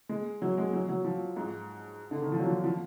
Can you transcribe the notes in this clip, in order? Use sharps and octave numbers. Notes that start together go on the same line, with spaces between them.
G#3
F#3
G#3
F#3
F#3
F3
G#2
D3
D#3
F3
F#3
F3
F3